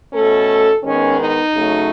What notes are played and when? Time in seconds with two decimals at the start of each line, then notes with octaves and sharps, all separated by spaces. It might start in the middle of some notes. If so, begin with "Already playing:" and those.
0.13 B2 A3 C#4 A4
0.83 D#3 G#3 B3 C#4
1.19 D#4
1.54 C#3 F#3 A3